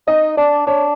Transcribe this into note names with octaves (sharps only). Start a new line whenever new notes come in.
D#4 D#5
D4 D5
D4 C#5